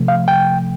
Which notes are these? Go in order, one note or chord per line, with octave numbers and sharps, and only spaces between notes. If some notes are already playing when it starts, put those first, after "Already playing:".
Already playing: C3 F3 A3
F5
G5